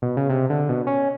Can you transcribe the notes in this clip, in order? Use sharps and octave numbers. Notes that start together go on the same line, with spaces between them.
B2
C#3
C3
D3
B2
C#4